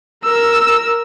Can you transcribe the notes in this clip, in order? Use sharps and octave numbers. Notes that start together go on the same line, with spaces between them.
A#4 E6